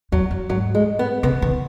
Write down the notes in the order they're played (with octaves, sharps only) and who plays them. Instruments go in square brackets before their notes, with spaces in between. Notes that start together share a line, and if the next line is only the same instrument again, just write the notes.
[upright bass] E2 [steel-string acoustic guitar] F#3
[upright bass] F#2
[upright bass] G#2 [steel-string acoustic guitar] F#3
[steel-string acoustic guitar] G#3
B3
[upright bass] C#3 [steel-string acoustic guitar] B3
[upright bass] D#3